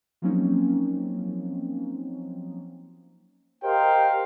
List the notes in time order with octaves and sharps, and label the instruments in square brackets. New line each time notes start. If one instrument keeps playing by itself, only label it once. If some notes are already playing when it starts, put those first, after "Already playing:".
[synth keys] F3 F#3 A#3 C4 C#4 D#4
[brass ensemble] G4 A#4 C5 D#5 F5 G5